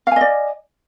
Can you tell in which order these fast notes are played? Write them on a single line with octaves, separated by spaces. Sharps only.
F5 G#5 D#5 D5